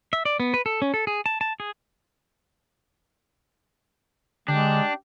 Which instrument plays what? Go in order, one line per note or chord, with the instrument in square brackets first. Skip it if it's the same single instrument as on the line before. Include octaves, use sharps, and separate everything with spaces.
[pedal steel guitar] E5
D5
B3
B4
A4
C#4
A4
G#4
A5
A5
G#4
[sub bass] D3 [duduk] G#3 [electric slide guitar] D4 [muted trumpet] G4